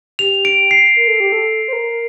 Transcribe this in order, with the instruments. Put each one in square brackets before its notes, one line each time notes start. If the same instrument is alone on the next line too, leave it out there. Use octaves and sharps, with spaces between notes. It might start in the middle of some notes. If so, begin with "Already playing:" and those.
[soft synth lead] G4 [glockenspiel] F7
[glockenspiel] D7
C7
[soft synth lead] A#4
A4
G4
A4
C5
A#4